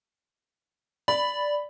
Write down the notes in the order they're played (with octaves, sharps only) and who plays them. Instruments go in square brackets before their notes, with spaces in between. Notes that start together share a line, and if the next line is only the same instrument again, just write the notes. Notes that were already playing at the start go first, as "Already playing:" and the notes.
[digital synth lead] D5 [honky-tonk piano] B5